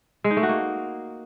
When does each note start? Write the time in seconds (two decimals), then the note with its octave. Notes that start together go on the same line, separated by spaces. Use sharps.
0.24 G#3
0.31 D#4
0.37 A3
0.43 F#4
0.49 A#3